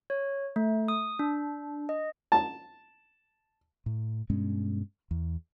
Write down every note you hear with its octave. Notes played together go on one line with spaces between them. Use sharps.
C#5
A3
D#6
D4
D#5
A5
A2
G2 B2 G#3 C#4
E2